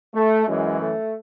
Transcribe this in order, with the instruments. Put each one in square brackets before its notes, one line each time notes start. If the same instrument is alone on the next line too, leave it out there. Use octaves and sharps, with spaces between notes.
[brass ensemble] A3
F#2 E3 G#3
A3